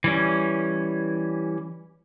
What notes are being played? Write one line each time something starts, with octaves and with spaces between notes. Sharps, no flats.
E3 G3 C#4